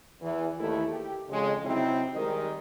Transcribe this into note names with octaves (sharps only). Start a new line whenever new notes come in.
E2 E3
D#2 A3 E4
G4
F2 C#3 G#3
C3 F#3 C4 D#4 E4 C5
D#3 G3 G#3 G4 A#4 D#5